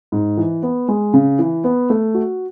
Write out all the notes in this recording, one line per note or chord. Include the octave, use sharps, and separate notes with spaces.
G#2
E3
B3
G#3
C#3
E3
B3
A3
F#4